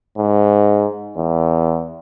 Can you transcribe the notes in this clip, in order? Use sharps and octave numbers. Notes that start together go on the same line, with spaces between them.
G#2
E2